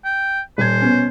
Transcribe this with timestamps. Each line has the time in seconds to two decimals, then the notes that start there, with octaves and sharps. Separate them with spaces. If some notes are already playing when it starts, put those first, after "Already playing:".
0.05 G5
0.58 D#1 C5 G#6
0.81 B2 C#4